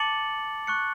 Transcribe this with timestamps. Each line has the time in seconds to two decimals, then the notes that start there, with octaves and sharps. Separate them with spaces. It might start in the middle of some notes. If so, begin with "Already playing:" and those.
Already playing: A5 D6 A6 C#7 F#7
0.67 C#6 F#6 C#7